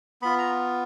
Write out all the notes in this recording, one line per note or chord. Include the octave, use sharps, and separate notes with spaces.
B3 F4 B5
A#5